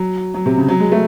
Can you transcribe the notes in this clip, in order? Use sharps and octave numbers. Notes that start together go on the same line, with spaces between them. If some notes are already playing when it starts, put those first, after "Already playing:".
Already playing: F#3
F#3
C3
C#3
F#3
G#3
A3